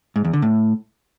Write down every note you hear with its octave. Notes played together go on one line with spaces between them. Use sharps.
G#2
E2
D3
A2